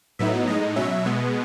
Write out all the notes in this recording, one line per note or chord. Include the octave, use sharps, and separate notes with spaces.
A2 F#3 B3 D#4 E5
A2 G#3 D#4 D#5
B2 F#3 C#4 E5
B2 G#3 B3